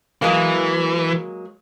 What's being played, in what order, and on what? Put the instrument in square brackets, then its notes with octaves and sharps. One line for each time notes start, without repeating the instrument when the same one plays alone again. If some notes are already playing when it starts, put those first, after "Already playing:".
[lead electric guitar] E3 [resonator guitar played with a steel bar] F#3 G#3 A#3